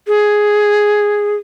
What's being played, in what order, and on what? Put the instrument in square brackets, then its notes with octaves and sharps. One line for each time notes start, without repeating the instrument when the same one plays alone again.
[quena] G#4